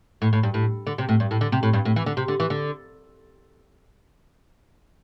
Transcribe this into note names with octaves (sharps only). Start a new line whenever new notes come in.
A2
A2
G2
A2
D3
C3
A2
G2
A2
D3
C3
A2
G2
A2
E3
D3
C3
D3
E3
D3